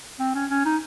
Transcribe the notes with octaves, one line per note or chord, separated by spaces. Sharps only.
C4
C#4
C#4
D#4